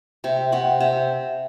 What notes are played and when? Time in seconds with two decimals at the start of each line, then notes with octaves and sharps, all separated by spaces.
0.24 C3 E5
0.52 C3 F#5
0.80 C3 E5